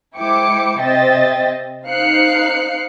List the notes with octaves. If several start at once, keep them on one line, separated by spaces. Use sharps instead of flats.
G#3 E4 C5 G5 D6 C#7
C3 C5 D#5 E5 G5 A6
D#4 C5 F5 F#6 C7 C#7